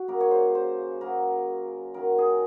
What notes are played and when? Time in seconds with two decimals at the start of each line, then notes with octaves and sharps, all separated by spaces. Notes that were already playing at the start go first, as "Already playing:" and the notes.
Already playing: F#4
0.08 C#3 F#3 A#3 A#4
0.21 C#5
0.31 C5
0.55 C5
1.01 C#3 F#3 A#3 A#4
1.94 F#2 D#3 F#3 A#4
2.18 G#4